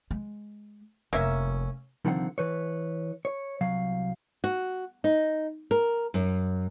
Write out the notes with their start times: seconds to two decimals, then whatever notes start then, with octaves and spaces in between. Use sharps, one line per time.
0.11 G#3
1.13 F1 A#3 C#4 E5
2.05 C2 D3 D#3 F3 C4 F#5
2.38 E3 B4 C#5
3.25 C#5
3.61 C2 F#3 F5
4.44 F#4
5.04 D#4
5.71 A#4
6.14 F#2